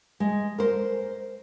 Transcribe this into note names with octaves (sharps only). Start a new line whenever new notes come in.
G#3
A#4 C5